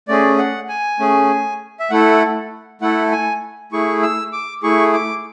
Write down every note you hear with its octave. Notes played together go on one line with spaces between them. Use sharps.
A3 C#4 G#4 D5
F#5
G#5
A3 C#4 G#4
E5
A3 E4 A4 F#5
A3 E4 A4 F#5
G#5
A3 E4 G#4 C#6
E6
D6
A3 E4 G#4 C#6
D6